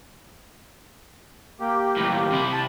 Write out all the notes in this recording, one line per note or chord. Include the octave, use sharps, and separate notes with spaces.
A#3 G4
D#2 A2
C3 E4
A5